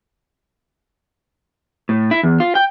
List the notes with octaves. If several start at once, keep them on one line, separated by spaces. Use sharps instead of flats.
A2
E4
E2
F4
G5